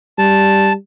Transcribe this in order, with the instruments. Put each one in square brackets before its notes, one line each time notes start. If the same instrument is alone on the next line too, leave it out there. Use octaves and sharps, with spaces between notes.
[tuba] G3 [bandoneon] A5